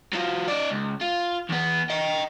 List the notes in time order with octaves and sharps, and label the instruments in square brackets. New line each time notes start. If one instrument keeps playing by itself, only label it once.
[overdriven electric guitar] F#3 F4
D#4 D5
C#2
F4
E2 B3
D#5 G5